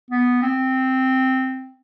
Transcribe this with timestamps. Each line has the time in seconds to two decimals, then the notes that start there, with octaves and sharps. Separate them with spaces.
0.11 B3
0.42 C4